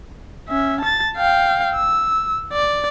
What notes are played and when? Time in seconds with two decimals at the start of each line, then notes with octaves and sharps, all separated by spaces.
0.49 C#4 E5
0.81 A5 A6
1.17 F5 G5
1.76 E6
2.53 D5